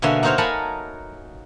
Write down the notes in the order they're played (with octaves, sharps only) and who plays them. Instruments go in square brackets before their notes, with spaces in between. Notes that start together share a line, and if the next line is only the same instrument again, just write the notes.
[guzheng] B2 D3 A#3 C#5 E5 G#5
A#3 D#4 F#4 C5 C#5 F5
A#4 C#5 F#5 G#5 A5 B5